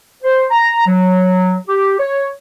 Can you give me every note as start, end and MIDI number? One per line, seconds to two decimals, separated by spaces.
0.23 0.45 72
0.51 0.83 82
0.87 1.55 54
1.68 1.95 67
2.00 2.27 73